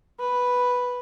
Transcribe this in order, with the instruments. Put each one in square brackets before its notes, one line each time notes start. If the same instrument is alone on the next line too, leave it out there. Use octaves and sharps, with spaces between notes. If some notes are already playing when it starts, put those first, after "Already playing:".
[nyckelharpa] B4